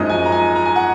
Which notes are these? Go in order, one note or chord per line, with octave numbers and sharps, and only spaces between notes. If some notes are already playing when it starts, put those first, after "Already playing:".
Already playing: F#2 F3 G#3 D#4 D#5
G#5
A#5
G#5
A#5
G#5
F#5